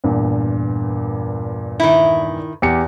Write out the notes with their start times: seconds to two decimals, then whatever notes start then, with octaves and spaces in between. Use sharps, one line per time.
0.04 E2 G2 A#2
1.80 D#3 E4
2.62 E2 G4 C#7